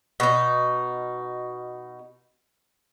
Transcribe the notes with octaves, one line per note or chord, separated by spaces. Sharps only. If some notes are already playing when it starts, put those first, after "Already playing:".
B2 D#4